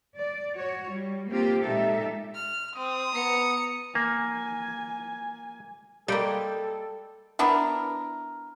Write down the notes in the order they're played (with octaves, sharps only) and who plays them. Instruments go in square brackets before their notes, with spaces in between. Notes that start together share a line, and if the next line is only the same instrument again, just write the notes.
[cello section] D5
F#4 C#5
G3
A#3 C4 F4 G4
A#2 G#3 D#4 G4 A4 E5
[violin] F6
[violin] C4 [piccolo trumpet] D#6
[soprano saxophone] B3 [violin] A#5 C#7
[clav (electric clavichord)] A#3 [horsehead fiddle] G#5
[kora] G3 G5 [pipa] G#3 A#3 [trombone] A4
[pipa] B3 D4 E4 A#4